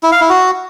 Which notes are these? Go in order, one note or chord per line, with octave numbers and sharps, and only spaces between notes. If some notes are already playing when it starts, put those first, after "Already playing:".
E4
F5
E4
F#4